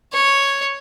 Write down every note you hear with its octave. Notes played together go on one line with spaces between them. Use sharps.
C#5